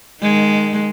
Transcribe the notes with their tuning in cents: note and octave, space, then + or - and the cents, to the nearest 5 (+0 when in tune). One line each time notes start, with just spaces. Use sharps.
D#3 -15 G#3 +5